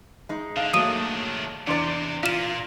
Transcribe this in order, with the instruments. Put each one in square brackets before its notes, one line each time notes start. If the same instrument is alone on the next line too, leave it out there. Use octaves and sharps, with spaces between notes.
[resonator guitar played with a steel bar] G#3 D#4
[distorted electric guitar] D3 [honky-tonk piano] F5
[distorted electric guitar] D#3 D4 [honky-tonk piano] F#3 A3 A#3 [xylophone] D#6 D#7
[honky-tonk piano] E2 C6 A6 [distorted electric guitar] C3 [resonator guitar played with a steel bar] D4 D5
[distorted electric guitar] A#2 [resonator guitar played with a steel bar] F4 [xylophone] F5 E7